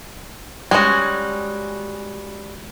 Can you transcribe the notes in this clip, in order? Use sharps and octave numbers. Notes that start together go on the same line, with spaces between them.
G3 G#3 C#4 F#4